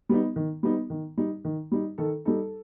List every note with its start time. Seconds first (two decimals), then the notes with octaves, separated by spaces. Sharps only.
0.09 G3 B3 D#4
0.36 D#3
0.63 G3 B3 D#4
0.90 D#3
1.17 G3 D#4
1.45 D#3
1.72 G3 D#4
1.98 D#3 A4
2.25 G3 D#4 A4